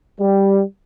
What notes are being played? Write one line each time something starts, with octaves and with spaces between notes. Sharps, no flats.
G3